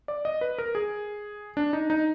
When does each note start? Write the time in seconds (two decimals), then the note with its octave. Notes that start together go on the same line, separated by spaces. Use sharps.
0.08 D5
0.25 D#5
0.41 B4
0.58 A#4
0.75 G#4
1.57 D4
1.73 D#4
1.90 D#4